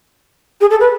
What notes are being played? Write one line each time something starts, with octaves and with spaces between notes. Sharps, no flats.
G#4
A4
B4